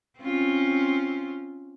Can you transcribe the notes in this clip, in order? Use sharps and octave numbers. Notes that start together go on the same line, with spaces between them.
C4 C#4 F4